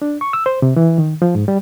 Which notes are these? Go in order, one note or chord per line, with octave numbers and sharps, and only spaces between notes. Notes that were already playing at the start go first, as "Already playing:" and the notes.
D4
C#6
E6
C5
C3
E3
D#3
F3
G#2
G3